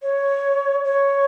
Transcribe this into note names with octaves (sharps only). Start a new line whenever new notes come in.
C#5
C#5